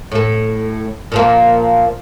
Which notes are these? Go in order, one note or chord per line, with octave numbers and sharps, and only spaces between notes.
A2 A4
A#2 F3 A#3